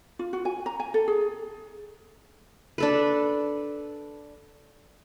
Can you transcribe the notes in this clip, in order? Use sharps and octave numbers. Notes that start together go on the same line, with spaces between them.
F4
F#4
G#5
A#5
G#5
A4
G#4
D4 A4 B4